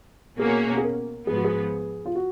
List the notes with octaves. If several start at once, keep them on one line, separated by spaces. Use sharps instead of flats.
B2 A#3 C#4 F#4 G#4
G#4
A#4
G#2 F3 B3 G#4
F#4
G#4
F4
F#4